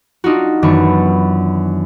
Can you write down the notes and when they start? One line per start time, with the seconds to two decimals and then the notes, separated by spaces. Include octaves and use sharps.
0.24 D4 D#4 F4 F#4
0.63 F#2 D#3 E3 B3 D4 C#6